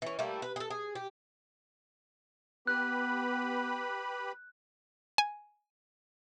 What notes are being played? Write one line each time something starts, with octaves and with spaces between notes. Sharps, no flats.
E3 C#4
G3 A3 A#3 E4
B4
G#4 A4
G#4
G4
B3 G4 B4 B5 F#6
G#5